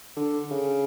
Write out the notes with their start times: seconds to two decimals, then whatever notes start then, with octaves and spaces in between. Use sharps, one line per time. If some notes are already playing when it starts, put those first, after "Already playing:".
0.17 D3
0.51 C#3